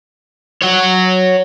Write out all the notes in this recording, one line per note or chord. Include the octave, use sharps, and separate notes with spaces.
C#5 F#5